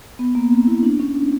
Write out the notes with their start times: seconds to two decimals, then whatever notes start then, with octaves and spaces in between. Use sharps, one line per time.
0.19 B3
0.35 A#3
0.51 C4
0.67 E4
0.83 D4
1.00 C#4